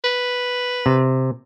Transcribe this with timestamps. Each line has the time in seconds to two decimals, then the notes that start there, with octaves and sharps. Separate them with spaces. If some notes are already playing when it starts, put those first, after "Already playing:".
0.04 B4
0.86 C3